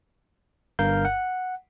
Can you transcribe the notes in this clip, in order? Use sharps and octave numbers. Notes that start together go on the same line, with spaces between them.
G1 G2 A#4 F5 G6
F#5